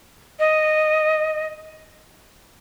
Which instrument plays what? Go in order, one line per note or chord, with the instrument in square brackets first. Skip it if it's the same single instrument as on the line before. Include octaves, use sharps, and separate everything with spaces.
[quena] D#5